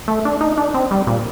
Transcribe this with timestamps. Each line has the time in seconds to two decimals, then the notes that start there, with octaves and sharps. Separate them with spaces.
0.08 A3
0.25 D4
0.41 D#4
0.58 D4
0.74 C4
0.91 G3
1.07 A#2